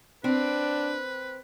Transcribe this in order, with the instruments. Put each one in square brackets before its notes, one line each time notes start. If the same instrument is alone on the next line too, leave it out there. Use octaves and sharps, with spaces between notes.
[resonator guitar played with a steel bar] C4 [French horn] D4 [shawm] B4